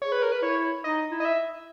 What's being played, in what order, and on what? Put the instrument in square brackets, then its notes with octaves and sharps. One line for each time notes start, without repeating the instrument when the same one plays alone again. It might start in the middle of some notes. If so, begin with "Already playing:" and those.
[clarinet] G#4 [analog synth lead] C#5
[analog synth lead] B4
A#4
B4
[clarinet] E4 [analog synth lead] C#5
[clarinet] D#4 [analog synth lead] D#5
[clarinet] E4
[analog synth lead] D#5
E5